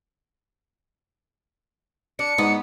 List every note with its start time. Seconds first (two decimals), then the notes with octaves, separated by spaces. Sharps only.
2.19 D4 C#7
2.38 G#2 B3